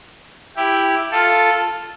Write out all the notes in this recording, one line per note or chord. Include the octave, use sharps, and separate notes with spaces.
E4 G4
F4 A4